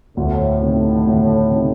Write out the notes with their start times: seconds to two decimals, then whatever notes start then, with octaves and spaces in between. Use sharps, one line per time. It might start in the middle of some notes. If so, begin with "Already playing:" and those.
0.17 D2 A2
0.62 C3 D#3
1.06 D2
1.51 C3 D#3